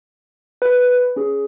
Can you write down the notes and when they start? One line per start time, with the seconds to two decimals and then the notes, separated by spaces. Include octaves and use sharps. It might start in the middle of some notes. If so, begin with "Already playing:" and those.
0.62 B4
1.16 C#4 G#4